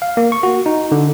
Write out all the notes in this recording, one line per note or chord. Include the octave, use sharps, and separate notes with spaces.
F5
A#3
C#6
F#4
D#4
D3